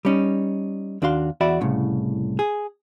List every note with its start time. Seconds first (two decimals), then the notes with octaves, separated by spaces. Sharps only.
0.05 G3 C#4 D#4
1.02 D#2 D4 F#4 F5 C6
1.41 E2 F#4 D5 E5 B5
1.60 C2 A2 C#3
2.39 G#4